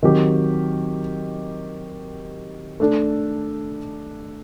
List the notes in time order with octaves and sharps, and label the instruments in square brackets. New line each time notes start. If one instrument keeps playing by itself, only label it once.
[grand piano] D#3 F#3 C4 G4
A3 D4 A4